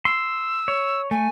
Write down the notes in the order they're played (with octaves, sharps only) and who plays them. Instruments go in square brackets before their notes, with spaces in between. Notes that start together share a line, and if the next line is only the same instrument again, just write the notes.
[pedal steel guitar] C6 [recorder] E6
[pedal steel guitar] C#5
[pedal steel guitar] A3 [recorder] G#5